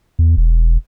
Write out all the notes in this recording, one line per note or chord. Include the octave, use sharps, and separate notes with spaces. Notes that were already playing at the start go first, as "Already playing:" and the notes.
E2
E1